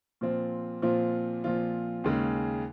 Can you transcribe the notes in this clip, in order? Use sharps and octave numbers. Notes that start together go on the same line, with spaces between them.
A#2 F3 C4 F4
A#2 F3 C4 F4
A#2 F3 C4 F4
D#2 C#3 G#3